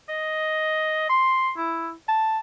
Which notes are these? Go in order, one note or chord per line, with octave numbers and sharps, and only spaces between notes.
D#5
C6
E4
A5